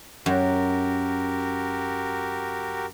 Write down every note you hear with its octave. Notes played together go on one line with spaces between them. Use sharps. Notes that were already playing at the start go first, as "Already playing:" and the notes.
F#2 F#4 G4 A#4